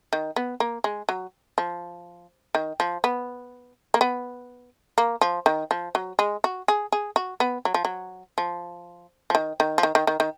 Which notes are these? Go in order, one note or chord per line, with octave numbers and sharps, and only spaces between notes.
D#3
B3
A#3
G#3
F#3
F3
D#3
F3
B3
A#3
B3
A#3
F3
D#3
F3
F#3
G#3
F#4
G#4
G#4
F#4
B3
F#3
F3
F#3
F3
F3
D#3
D#3
F3
D#3
D#3
D#3
D#3